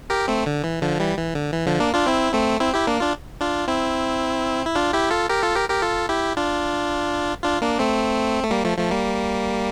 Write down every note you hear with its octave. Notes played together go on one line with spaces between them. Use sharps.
G4 A#4
A3 C4
D3
E3
D3 F3
E3 G3
E3
D3
E3
D3 F3
A#3 D4
D4 F4
C4 E4
A3 C4
C4 E4
E4 G4
A#3 D4
D4 F4
D4 F4
C4 E4
E4
D4 F4
E4 G4
F4 A4
G4 A#4
F4 A4
G4 A#4
G4 A#4
F4 A4
E4 G4
D4 F4
D4 F4
A#3 D4
A3 C4
A3
G3 A#3
F3 A3
F3 A3
G3 A#3